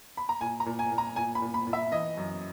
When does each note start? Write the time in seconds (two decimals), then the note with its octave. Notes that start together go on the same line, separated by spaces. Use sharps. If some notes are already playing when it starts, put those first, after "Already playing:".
0.17 B5
0.29 A#5
0.41 A#2 G#5
0.60 A#5
0.66 A#2
0.79 G#5
0.91 A#2
0.98 A#5
1.16 A#2 G#5
1.35 B5
1.42 A#2
1.54 B5
1.67 A#2
1.73 E5
1.92 E3 D#5
2.17 F#2